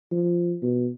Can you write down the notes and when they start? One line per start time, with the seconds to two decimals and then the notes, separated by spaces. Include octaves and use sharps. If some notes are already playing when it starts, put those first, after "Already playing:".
0.11 F3
0.62 B2